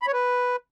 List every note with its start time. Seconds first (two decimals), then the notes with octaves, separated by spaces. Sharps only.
0.02 B5
0.07 C#5
0.13 B4